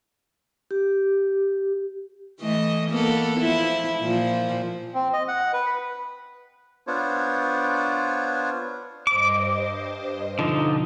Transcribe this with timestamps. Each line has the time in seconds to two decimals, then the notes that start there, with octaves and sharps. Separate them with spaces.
0.71 G4
2.40 E3 A3 D#5
2.90 A#3 B3 A4
3.40 F3 E4
4.01 A#2 F3
4.94 C4
5.13 D#5
5.28 F#5
5.53 B4
5.66 B5
6.87 B3 D4 F4 C5 C#5
9.07 G2 C5 D#5 D6
10.39 B2 D3 F3 D#4